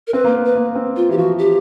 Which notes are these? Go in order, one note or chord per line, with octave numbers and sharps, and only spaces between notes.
A#4
C4 B4
A#3
B3
B4
A#3
C4
F4
E3 G4
F3 F#4
G4